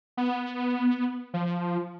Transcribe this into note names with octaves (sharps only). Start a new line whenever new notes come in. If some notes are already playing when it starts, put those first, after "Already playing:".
B3
F3